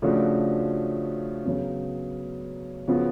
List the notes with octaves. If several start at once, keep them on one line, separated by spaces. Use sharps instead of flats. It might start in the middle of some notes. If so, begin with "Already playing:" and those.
C#3 F3 A3 D4 F#4
C#3 F#3 B3
C#3 F3 B3 F#4